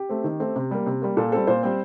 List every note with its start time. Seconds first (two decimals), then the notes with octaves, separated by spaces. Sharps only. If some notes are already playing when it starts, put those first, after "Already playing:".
Already playing: G4
0.09 A3 C4
0.24 D#3
0.40 A3 C4
0.56 C3
0.71 G3 A#3
0.86 C3
1.02 G3 A#3
1.17 A#2 A4
1.32 G3 C4 A4
1.47 A#2 C5
1.63 G3 C4